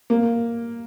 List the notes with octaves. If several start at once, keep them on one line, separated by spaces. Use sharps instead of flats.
A#3